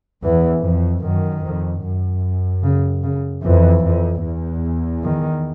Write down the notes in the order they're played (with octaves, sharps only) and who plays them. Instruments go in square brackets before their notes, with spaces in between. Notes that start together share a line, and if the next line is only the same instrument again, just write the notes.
[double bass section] E2 [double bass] E3
[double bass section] F2
[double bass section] F#2 [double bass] D#3
[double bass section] F2
F#2
[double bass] C#3
C#3
[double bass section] F2 [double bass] E3
[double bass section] F2
E2
[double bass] D#3